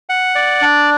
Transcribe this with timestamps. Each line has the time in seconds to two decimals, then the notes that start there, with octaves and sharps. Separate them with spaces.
0.09 F#5
0.35 D5
0.62 D4